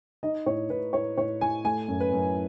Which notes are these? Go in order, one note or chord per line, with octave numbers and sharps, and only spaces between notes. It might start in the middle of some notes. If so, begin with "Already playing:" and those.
D#4 D#5
A2 C#5
A2 B4
A2 C#5
A2 C#5
A2 G#5
A3 G#5
F#2
B4
F#2